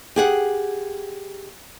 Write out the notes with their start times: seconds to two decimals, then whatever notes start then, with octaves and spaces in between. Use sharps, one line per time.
0.16 G4 G#4 F#5